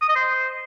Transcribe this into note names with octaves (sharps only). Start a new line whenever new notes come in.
D#6
D#5
C5